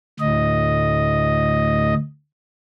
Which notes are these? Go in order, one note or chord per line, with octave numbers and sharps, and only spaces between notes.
D2 A2 D#5